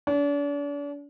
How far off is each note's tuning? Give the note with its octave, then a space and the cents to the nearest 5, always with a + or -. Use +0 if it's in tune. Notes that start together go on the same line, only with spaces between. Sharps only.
D4 -40